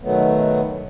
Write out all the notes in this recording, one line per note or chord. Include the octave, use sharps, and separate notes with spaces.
B2 D#3 F#3 A3 B3